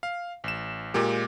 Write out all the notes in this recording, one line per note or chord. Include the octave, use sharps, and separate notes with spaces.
F5
A1 E7
A#2 G#3 A#3 G4